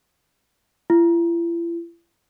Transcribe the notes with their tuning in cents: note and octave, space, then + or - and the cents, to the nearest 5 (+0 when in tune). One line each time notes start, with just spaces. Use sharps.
E4 +45